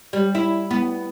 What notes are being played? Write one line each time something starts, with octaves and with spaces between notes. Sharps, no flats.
G3
E4
B3